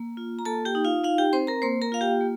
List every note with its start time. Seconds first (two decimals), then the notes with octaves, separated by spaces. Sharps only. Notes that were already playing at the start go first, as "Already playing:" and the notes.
Already playing: A#3
0.17 F4
0.39 A#5
0.45 A#3 A4 A5
0.65 G4 G5
0.75 D#4
0.85 F4 F5
1.04 D#4 F4 F5
1.18 G4 G5
1.33 C4 C5 C6
1.47 A#4 A#5
1.62 A#3 C5 C6
1.82 A#4 A#5
1.92 F4 F5
2.01 G4 G5
2.21 A#3